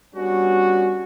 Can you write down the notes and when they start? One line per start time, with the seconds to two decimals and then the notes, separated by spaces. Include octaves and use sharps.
0.15 G3 B3 C#4 D4 F#4